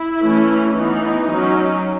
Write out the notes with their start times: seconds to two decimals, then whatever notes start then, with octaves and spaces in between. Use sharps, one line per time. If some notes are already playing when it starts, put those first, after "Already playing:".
Already playing: E4
0.22 E3 A3 C#4
0.77 E3 B3 D#4
1.33 F#3 C#4